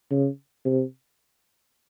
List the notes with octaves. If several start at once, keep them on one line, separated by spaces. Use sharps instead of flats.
C#3
C3